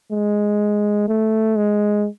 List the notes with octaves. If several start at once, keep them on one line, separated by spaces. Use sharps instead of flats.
G#3
A3
G#3